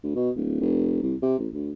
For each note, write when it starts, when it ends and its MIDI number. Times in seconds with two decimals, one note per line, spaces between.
0.03 0.14 38
0.16 0.30 47
0.36 0.60 26
0.61 1.00 29
1.03 1.15 36
1.22 1.37 48
1.39 1.48 33
1.53 1.72 38